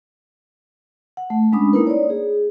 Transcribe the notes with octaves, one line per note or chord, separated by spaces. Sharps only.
F#5
A3
G#3 C#4 D4 B5 D#6
A#3 D#4 E4 A#4 B4
C#5 D5
G#4